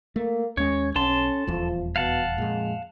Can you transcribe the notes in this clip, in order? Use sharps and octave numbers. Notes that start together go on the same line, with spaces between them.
A3 A#3
D#2 G#3 C#4 C#5
B1 C#4 A4 A5 C6
D#1 E2 F3
B2 F5 F#5 A5
F2 A#2 G#3